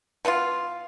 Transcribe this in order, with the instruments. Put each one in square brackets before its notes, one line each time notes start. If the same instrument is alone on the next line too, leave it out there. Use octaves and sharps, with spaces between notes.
[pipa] B2 B3 D#4 F4